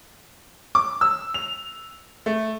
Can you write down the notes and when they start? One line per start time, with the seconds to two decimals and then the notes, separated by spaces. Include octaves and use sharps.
0.75 D6
1.01 E6
1.34 F7
2.26 A3